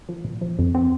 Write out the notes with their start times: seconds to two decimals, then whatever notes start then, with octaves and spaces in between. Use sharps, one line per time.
0.09 F3
0.25 A#2
0.41 F3
0.59 F2
0.75 C4